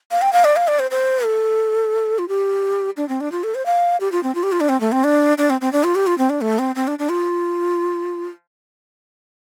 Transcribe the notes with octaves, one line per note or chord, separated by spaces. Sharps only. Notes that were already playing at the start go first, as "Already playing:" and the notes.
F5
G5
F5
D5
F5
D5
C5
C5
A4
F4
G4
D4
C4
D4
F4
A4
C5
F5
G4
F4
C4
F4
G4
F4
D4
C4
A3
C4
D4
D4
C4
C4
D4
F4
G4
F4
C4
D4
A3
C4
C4
D4
D4
F4